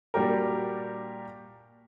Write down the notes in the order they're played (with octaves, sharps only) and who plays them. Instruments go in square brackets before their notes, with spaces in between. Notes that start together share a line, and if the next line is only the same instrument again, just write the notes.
[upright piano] A#2 G3 D4 F#4 G4 A#4